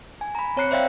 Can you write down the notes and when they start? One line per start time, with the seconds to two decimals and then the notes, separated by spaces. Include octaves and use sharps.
0.21 G#5
0.35 A#5 B5
0.57 C4 C#5 A#5 F#6 C7 C#7
0.71 C5 D5 E5 F5 G5